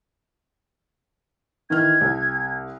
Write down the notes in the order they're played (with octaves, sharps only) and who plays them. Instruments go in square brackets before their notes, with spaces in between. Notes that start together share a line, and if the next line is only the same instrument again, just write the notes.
[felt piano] D#3 E3 F6 [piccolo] G#6
[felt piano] C2